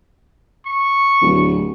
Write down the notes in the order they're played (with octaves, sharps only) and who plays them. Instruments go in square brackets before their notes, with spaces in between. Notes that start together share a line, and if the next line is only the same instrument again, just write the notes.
[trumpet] C#6
[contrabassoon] D1